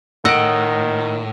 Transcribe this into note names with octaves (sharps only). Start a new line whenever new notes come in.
A2 D#3 D#5 F#5 E6 D7